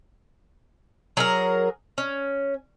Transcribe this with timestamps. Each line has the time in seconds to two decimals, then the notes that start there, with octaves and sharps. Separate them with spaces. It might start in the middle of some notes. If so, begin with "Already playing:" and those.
1.17 F#3 G#4 A#4
1.98 C#4